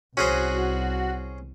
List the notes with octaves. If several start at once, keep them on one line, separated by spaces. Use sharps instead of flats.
C2 C#4 F#4 G#4 C5